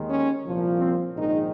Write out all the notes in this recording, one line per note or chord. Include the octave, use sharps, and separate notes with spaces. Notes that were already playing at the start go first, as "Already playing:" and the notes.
Already playing: D#2 D#3 G#3
C#4
C2 A#2 F3
C4
A#1 G#2 D#3 G#3 D#4